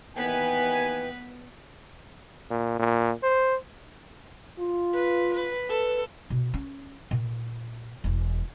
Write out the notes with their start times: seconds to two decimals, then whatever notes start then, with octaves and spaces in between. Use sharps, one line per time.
0.16 D#2 D#3 E3 B3 B4 G5 G#5
2.51 A#2
2.79 A#2
3.23 C5
4.59 F4
4.94 B4
5.34 B4
5.69 A4 B4
6.30 B2
6.54 C#4
7.11 A#2
8.04 E1 E3